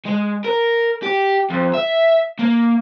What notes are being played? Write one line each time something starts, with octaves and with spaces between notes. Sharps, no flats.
G#3
A#4
G4
F2
E5
A#3